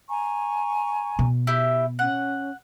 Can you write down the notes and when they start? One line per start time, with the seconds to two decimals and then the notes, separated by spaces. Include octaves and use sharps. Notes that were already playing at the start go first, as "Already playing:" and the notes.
0.09 G#5 A#5 C#6
1.19 B2
1.47 E4 G4
1.99 C#4 F#5